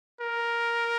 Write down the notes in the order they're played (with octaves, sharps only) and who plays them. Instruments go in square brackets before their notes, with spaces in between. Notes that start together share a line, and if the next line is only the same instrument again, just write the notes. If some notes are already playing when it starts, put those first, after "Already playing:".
[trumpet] A#4